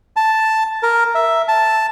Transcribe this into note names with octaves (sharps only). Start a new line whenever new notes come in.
A5
A#4
E5
A5